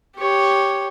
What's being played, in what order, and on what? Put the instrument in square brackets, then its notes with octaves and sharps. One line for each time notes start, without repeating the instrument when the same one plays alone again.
[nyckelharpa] G4 C#5